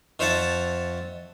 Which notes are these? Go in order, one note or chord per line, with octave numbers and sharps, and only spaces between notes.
F2 C5 C#5 E5 F#5 A5